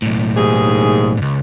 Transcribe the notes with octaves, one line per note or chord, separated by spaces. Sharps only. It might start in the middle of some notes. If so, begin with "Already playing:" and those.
B1 A2
D#2 G#2 G#4
C#2 G2